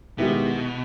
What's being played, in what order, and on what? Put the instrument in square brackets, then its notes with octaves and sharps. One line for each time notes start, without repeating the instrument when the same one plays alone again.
[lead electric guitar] B2 [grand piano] D#3 G#3 B3 E4 G4